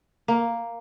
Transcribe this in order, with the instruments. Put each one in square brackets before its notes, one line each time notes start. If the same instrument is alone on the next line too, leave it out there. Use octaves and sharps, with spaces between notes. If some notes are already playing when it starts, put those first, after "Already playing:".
[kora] A#3